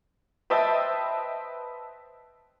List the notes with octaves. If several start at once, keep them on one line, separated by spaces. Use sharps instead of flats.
B4 C5 D#5 E5 G5 A5